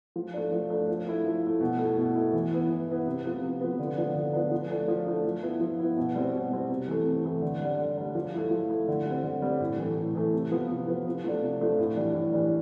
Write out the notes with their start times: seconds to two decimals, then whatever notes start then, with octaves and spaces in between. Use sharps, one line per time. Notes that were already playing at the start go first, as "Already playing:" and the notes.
0.16 F3
0.34 A3 D4
0.52 F3
0.70 A3 D4
0.89 F3
1.06 A3 E4
1.25 F3
1.43 A3 E4
1.61 B2
1.79 A3 E4
1.98 B2
2.15 A3 E4
2.33 E3
2.52 B3 E4
2.70 E3
2.88 B3 E4
3.06 C3
3.24 F3 B3
3.42 C3
3.61 F3 B3
3.79 D3
3.97 F3 B3 D4
4.15 D3
4.33 F3 B3 D4
4.51 F3
4.70 A3 D4
4.88 F3
5.06 A3 D4
5.24 F3
5.42 B3 E4
5.61 F3
5.79 B3 E4
5.97 B2
6.15 G3 C4
6.33 B2
6.52 G3 C4
6.69 C3
6.88 E3 A3
7.06 C3
7.24 E3 A3
7.42 D3
7.61 G3 D4
7.79 D3
7.97 G3 D4
8.15 F3
8.34 A3 E4
8.51 F3
8.69 A3 E4
8.88 D3
9.06 G3 C4
9.24 D3
9.42 G3 C4
9.60 A2
9.79 E3 A3
9.97 A2
10.15 E3 A3
10.33 C3
10.51 F3 B3
10.70 C3
10.88 F3 B3
11.06 C3
11.24 F3 A3 D4
11.42 C3
11.61 F3 A3 D4
11.79 A2
11.97 E3 G3 D4
12.15 A2
12.33 E3 G3 D4